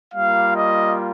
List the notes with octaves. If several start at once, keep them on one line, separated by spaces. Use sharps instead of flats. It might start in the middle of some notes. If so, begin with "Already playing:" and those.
G3 A#3 F4 F5
D#5